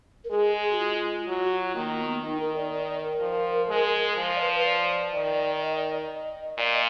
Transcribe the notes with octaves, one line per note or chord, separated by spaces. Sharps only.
A#4
G#3 G#4
G#4
F#4
F4
F#3 F#4
F#4
F4
D#3 A#3
B3
D#3 D#4
A#4
D5
D5
D5
A#4
F3
G#3
F3
D5
B4
D5
D#3
D#5
D5
D#5
A#2 D5
D#5